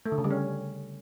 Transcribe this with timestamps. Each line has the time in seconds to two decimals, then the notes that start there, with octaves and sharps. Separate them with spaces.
0.06 A3
0.12 D3
0.18 C#3
0.24 G3
0.31 C#4